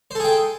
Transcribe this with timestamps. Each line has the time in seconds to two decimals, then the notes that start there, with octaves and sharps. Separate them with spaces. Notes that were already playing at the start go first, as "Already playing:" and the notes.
0.11 C5
0.15 A4
0.20 G#4
0.24 G5